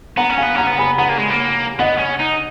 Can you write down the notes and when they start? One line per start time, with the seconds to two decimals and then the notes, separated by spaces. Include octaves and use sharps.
0.17 B3 F#5 A#5
0.29 C#4
0.38 B3 F5 G#5
0.55 C#4 F#5 A#5
0.67 B3
0.78 G#5 B5
0.98 B3 F#5 A#5
1.09 A#3
1.18 G#3
1.30 A#3
1.79 B3 D#5 F#5
1.99 C#4
2.20 D#4